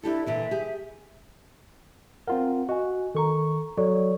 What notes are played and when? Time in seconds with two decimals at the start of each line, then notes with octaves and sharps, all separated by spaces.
0.03 D4 E4 G4 A4
0.26 A#2 D3 E3 E5
0.51 G4 G#4
2.27 C4 F4 A#4 F#5
2.69 F#4 D#5 G#5
3.15 D#3 A4 A#5 C#6
3.77 F#3 A4 D5 C#6